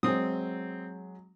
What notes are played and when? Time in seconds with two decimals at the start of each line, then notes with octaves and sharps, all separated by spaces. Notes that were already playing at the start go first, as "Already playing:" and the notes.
0.03 F#3 G#3 C4 D#6